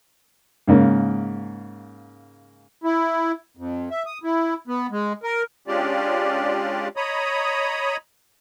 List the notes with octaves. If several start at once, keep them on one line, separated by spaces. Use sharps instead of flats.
G#2 C#3 A#3
E4
F2
E5
D#6
E4
B3
G#3
A#4
G#3 C#4 D4 F4 G4 D5
C#5 D#5 A#5 B5 D#6